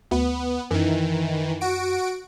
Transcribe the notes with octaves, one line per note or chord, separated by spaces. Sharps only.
D2 B3
F#2 D#3 E3
F#4 D7